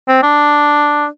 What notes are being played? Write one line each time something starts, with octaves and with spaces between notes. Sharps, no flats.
C4
D4